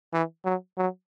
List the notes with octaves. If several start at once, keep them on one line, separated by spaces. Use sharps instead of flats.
E3
F#3
F#3